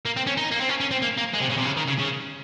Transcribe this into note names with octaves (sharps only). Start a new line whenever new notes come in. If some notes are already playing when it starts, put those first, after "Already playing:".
A#3
C4
C#4
D#4
A#3
C4
C#4
C#4
C4
A#3
A#3
G#3
C3
C#3
C3
C#3
D#3
C#3
C#3